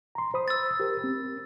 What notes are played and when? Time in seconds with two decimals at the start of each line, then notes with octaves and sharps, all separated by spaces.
0.15 A#5 C6
0.34 C5 B5 D#6
0.48 E6 A6
0.80 G4 A#4
1.04 C4